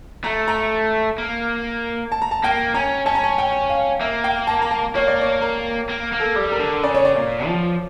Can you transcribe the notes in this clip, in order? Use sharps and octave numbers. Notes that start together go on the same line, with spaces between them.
A3 A#5
A#5
A#3
A5
A#5
A5
A#3 G5
C#4 A#5
C#4 A5
A#5
A5
G5
F5
A#3 E5
G5
A5
A#5
A5
A#3 C#5
D5
C#5
A#4
A#3
A#3
A4
G3
A#4
D3
C#3 D5
C#5
D5
A#2
F3